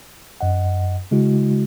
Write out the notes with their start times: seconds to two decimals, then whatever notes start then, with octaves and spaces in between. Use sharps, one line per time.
0.41 F#2 D#5 F#5
1.11 C#3 G#3 E4 F#4